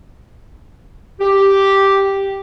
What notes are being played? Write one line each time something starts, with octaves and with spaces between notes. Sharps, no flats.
G4